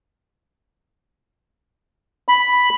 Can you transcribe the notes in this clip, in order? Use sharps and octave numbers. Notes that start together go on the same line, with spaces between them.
B5